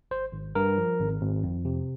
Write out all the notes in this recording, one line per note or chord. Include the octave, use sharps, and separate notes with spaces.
G#1 C5
G#1
G2 A#4
F3
G#1
G#1
F2
C3